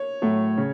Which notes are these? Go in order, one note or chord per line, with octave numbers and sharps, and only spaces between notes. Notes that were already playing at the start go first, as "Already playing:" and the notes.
Already playing: C#5
A2 F#3 A3
C#3